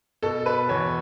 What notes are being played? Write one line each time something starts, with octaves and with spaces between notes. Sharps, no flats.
B2 A4
B2 B4
E2 C#5